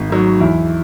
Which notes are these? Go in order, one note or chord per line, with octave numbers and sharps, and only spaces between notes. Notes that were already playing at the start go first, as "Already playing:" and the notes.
Already playing: G#1
G#2 D#3 F#3
E2 E4